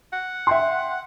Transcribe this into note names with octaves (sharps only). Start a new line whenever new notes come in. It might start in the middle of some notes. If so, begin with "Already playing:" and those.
F#5
E5 G5 C6